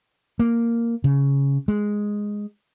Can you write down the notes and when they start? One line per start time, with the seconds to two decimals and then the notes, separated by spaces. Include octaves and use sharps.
0.39 A#3
1.04 C#3
1.68 G#3